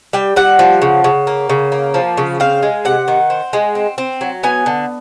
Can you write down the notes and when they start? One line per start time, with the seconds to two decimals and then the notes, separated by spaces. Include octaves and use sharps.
0.13 G3 G5
0.36 G3 F#5
0.59 F3
0.82 C#3
1.04 C#3
1.27 A#3
1.50 C#3
1.72 A#3
1.94 F3
2.17 C#3
2.40 C4 F5
2.63 G#3
2.85 C3 F#5
3.08 D#3
3.30 C4
3.53 G#3
3.75 C4
3.98 C4
4.21 F#3
4.43 B3 G#5
4.66 D3